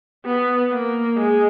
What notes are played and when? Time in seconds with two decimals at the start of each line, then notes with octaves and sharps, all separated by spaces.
0.26 B3
0.72 A#3
1.17 G#3